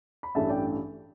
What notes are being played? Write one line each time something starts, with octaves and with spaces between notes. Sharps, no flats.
B5
A1 G2 E3 A3 E5 A5
D5 G5